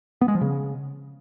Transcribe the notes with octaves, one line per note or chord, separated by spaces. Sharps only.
B3
G#3
F3
C#3